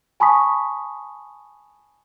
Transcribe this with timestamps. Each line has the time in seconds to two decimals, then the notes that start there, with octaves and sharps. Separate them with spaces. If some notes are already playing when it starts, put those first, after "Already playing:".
0.20 G#5 A5 B5 C#6 D#6 B6